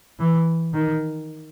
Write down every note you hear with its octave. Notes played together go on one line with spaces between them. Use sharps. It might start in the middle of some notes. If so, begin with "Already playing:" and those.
E3
D#3